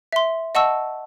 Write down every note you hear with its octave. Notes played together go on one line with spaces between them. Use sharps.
E5 C6
D#5 F#5 A5 C#6 E6